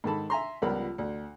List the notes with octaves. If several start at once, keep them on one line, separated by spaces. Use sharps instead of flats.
G#2 D#3 A4 A5 B5
E5 G#5 A#5 C6
C#2 F3 G3 B3 A#4 B5
D2